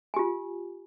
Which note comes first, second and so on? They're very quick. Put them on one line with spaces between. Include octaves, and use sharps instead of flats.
G#5 G4 F4